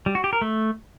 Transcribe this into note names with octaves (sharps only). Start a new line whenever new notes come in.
G3
F#4
G4
A#4
A3